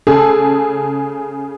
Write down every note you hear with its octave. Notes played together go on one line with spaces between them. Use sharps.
C#3 G#4 A4